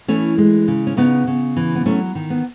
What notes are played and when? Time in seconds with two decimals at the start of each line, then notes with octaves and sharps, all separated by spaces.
0.08 E3 A3 C#4
0.38 G#3
0.68 C#3
0.87 C#4
0.97 C#3 B3 D#4
1.27 C#3
1.57 E3
1.75 B3
1.86 F#3 A3 C#4
2.15 D#3
2.30 B3